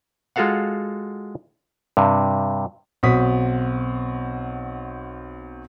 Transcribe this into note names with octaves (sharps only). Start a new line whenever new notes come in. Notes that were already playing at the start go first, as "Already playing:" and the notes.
G#3 F4 F#4 A4 F5 F#5
G2 C3
B1 C4 F#4 D#6 B6